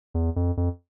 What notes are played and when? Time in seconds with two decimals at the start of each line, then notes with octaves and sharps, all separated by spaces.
0.14 E2
0.36 F2
0.57 F2